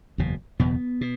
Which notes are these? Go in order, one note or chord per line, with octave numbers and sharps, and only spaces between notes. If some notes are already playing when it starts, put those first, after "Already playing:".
F#1 E2 B2
F#1 E2 B2 B3
B2